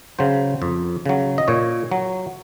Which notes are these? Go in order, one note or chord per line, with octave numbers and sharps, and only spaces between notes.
C#3 F#3 C5
F2
C#3 F#3
D#5
A#2 C#5
F#3